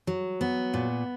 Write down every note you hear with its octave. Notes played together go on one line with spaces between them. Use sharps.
F#3
B3
A#2